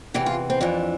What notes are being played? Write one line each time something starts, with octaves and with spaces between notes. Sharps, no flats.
E2 C3 E3 G4
F4
C4
F2 E3 D4